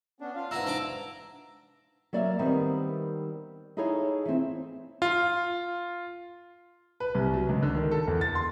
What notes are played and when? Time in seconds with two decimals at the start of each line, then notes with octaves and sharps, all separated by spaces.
0.20 B3 C#4 D4
0.36 F4 F5
0.51 G#2 E4 F#4 B4 A#5 E6
0.66 D4 E4 D6
2.13 F#3 A#3 D5 E5 F5
2.39 D#3 G3 B3 C4 A#4
3.77 D#4 E4 G#4 A4 C#5 F5
4.25 E3 C4
5.02 F4
7.00 B4
7.15 C2
7.34 F#3
7.49 C#2
7.63 D3
7.75 D#3
7.91 A4
8.08 E2
8.21 A6
8.35 C6